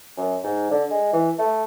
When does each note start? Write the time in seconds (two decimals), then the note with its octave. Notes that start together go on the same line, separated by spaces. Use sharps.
0.17 F#2
0.44 G#2
0.71 D3
0.91 G#3
1.13 E3
1.39 A3